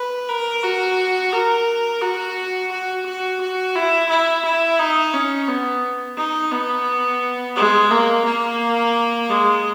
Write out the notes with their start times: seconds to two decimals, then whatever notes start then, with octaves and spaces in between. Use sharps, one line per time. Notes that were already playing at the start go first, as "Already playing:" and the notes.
Already playing: B4
0.29 A#4
0.64 F#4
1.33 A#4
2.02 F#4
2.72 F#4
3.06 F#4
3.41 F#4
3.75 E4
4.09 E4
4.45 E4
4.79 D#4
5.14 C#4
5.48 B3
6.17 D#4
6.52 B3
7.56 G#3
7.91 A#3
8.25 A#3
9.29 G#3